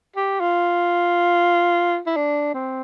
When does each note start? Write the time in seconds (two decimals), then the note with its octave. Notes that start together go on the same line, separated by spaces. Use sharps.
0.16 G4
0.40 F4
2.07 E4
2.17 D4
2.54 C4